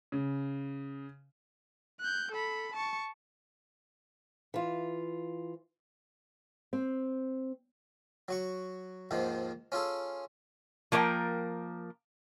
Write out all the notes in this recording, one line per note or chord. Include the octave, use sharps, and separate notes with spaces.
C#3
F#6 G6
A4 B5
A5 C#6
E3 F4
C4
F#3 F#4 C#6
D#2 G#2 D#3 F3
C#4 F4 G#4 A4
F3 A#3 A#4 C#5 G5